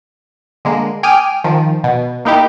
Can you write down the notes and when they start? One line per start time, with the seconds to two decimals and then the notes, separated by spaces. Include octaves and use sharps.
0.65 D3 G#3 A#3
1.03 G5 G#5 D6 D#6 F6
1.44 D#3 F3
1.84 B2
2.25 A#3 D#4 E4 G4